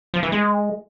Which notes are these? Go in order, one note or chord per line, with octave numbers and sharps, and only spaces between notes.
F3
E3
G#3